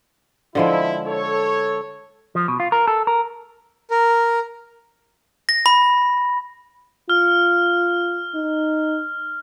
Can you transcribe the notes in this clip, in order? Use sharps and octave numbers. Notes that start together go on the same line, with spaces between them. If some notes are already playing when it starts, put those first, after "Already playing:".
D3 F3 G#3 E4
A4 C#5
F3
B2
F4
A#4
A4
A#4
A#4
A#6
B5
F4 F6
D#4